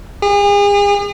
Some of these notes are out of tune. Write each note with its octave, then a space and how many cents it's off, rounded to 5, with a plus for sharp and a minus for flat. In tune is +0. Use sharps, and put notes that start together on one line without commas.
G#4 -40